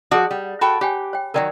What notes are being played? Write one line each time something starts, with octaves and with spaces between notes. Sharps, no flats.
F3 F#4 G#4 D5 D#6
G3
F#4 A4 G5 B5
G4 C#5 G5 G#5
C#5 G5
D#3 F3 F#3 A#4 D5 G5